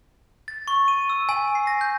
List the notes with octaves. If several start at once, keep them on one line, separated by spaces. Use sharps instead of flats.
A6
C#6
D#7
E6
G#5
C7
A#6
G6